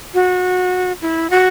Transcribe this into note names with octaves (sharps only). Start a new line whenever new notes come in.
F#4
E4
F#4